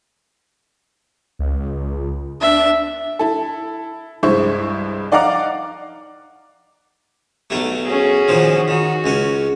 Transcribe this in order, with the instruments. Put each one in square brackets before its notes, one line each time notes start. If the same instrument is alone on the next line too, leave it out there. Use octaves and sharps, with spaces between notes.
[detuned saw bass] C#2
[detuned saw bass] D4 [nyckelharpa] E5
[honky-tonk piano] E4 A4
C2 G2 G#3 E4 C5 C#6
D#4 D5 F5 F#5 A#5 D6
[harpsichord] B1 F#3 A3
[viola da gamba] C#4 F#4 G#4
[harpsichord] A#2 D#3 F3
[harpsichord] D#3 [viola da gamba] F#4
[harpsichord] C#2 C#4